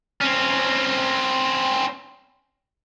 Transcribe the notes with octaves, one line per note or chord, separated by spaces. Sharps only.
C4 C#4